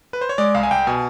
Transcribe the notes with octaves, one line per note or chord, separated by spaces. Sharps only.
B4
C5
C#5
G#3 D5
C2 F5
G#5
C2 G5
B2 G#5